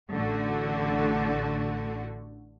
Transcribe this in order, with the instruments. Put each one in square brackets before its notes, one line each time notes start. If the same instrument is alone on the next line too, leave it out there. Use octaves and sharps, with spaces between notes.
[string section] A1 D3 A3 F#4